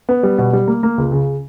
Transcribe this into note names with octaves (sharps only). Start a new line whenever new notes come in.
B3
G3
B2
G3
A#3
A#3
C#2
C#3